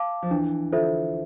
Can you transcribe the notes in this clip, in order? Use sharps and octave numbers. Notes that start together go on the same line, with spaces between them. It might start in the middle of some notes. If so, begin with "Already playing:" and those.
Already playing: F5 A5 D6
F3
E3 D4
D3 F4 A4 C5 E5